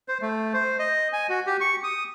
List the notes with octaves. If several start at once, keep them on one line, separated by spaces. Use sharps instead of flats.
C5
A3
C5
D#5
G#5
F#4
G4
C#6
D#6